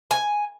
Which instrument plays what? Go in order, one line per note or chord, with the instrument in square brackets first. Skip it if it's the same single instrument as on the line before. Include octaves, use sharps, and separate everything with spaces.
[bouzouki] G#5